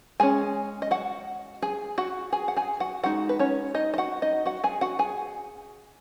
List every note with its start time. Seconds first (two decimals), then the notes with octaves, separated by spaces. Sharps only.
0.20 G#3 C#4 G#4 G#5
0.82 D#5
0.91 F#4 F#5
1.62 G#4 G#5
1.98 F#4 F#5
2.33 G#4 G#5
2.48 F#5
2.57 G#4 G#5
2.80 F#4 F#5
3.04 G#3 D#4 F#4 F#5
3.29 B4
3.39 C#4 C#5
3.74 D#4 D#5
3.94 D#5
3.98 F#4 F#5
4.22 D#4 D#5
4.46 F#4 F#5
4.64 G#4 G#5
4.81 F#4 F#5
4.99 G#4 G#5